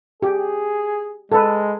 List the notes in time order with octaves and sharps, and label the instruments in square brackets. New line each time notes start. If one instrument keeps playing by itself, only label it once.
[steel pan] G4 [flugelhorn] G#4
[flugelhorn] G#3 [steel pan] A4 B4